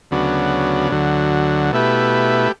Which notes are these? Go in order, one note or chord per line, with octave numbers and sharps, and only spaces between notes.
D2 C#3 F#3 B3 D4
D2 D3 F#3
B2 A3 E4 G4 B4